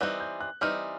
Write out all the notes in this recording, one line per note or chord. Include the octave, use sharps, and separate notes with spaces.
E3 G3 C4 D#4 F#6
G6
F#6
E3 G3 C4 D#4 F6